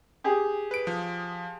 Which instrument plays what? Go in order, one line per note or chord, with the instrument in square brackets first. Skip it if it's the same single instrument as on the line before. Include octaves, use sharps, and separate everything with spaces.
[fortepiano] G4 G#4
[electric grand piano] B4 D7
F3